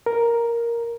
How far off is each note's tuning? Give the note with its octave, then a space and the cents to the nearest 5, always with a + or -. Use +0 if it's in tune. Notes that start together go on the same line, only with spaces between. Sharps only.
A#4 +5